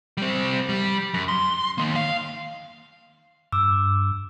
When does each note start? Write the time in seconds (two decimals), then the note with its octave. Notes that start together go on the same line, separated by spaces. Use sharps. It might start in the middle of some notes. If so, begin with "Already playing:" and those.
0.17 G3 C4
0.69 G3
1.14 F#2
1.28 C6
1.78 D#3 A#3
1.96 F5
3.52 G2 D6 E6